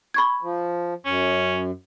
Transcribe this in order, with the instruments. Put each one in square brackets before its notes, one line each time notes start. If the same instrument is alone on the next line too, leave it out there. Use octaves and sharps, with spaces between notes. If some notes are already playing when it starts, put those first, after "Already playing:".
[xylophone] B5 C#6 G#6
[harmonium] F3
[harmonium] F#2 [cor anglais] C#4